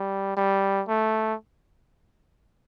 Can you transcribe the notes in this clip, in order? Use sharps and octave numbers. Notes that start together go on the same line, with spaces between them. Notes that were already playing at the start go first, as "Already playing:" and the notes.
Already playing: G3
G3
A3